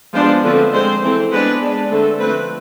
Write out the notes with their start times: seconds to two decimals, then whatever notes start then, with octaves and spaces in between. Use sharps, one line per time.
0.14 F3 G#3 B3 D4 C5
0.43 D3 F3 A3 C4 B4
0.72 G#3 C4 C5
1.02 E3 A3 C4
1.32 G#3 B3 D4 B4
1.61 G#3 D4
1.91 D3 A3 C4 A4
2.20 F3 A3 C4 B4